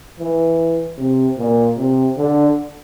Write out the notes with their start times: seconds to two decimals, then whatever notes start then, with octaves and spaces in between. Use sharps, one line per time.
0.19 E3
0.98 C3
1.37 A#2
1.77 C3
2.17 D3